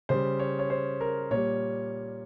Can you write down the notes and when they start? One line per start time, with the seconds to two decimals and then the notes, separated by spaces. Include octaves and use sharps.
0.09 C#3 G3 C5
0.39 C#5
0.59 C#5
0.70 C5
1.01 A#4
1.31 A#2 G3 C#5